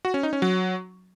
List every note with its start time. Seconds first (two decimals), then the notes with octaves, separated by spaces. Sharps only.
0.05 F#4
0.14 C#4
0.23 D#4
0.33 C#4
0.42 F#3